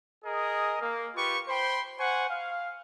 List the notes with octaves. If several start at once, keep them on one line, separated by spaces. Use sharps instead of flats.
G#4 A#4 D#5
A#3
F4 G4 B4 C#6
C5 G5 B5 C6
C5 F#5 G#5 C#6
F5